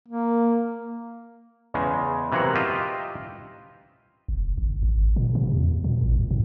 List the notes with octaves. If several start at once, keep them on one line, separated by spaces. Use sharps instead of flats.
A#3
E2 C#3 G#3
C3 E3 F#3 A#3 F#5
F4 G4 D#5 E5 G5
F1
G1
G#1
A#2
C3
E2
A#2
A1
C2
G#2